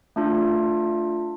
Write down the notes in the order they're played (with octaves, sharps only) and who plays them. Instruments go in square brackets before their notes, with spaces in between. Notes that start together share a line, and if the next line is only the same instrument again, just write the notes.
[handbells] A3 D4 F4